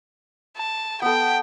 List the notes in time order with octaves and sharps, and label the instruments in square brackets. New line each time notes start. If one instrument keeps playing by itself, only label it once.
[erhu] A5
[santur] B3 A4 [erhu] G5